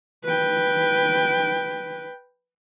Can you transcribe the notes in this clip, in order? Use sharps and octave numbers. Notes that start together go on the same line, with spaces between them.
B4 G5